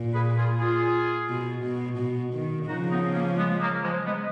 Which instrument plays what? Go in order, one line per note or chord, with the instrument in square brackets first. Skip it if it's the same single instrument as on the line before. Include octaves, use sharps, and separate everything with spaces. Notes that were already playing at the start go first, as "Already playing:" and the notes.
Already playing: [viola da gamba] A#2
[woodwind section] G#4 B4
F4 G#4
F4 G#4
[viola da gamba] B2
B2
B2
D#3
[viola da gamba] C#3 F3 [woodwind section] D#4 F#4
[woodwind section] B3 D#4
A#3 C#4
G#3 B3
F#3 A#3
F3 G#3
G#3 B3